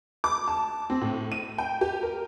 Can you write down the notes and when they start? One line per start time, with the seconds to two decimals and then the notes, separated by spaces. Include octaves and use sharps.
0.24 D6
0.48 A5
0.90 C4
1.01 A2
1.32 D#7
1.58 G5
1.81 G4
2.03 A#4